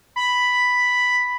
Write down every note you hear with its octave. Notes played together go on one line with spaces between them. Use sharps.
B5